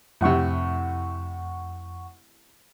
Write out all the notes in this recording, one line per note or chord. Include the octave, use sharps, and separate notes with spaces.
F2 A2 C3 F#5 C#6